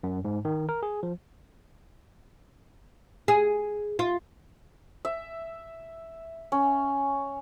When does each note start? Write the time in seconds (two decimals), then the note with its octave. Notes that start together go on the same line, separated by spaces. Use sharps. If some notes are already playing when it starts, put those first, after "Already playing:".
0.03 F#2
0.25 G#2
0.45 D#3
0.69 A#4
0.83 G#4
1.03 F3
3.28 G#4
3.99 F4
5.05 E5
6.52 C#4